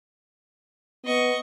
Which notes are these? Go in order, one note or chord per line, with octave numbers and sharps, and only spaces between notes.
B3 D#5 C#6